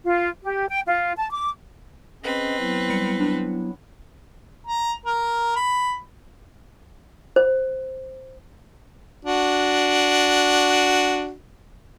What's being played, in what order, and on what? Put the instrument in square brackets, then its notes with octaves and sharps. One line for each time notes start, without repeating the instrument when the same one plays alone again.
[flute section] F4
G4
G5
F4
A5
D6
[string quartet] C4 B4 [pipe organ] C#4 G#4 D#5
[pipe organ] F#3 B3 E4
[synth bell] G3 C#7
D4
[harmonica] A#5
A#4
B5
[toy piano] C5
[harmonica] D4 F#4